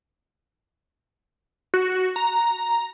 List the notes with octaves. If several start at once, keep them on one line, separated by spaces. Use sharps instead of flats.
F#4
A#5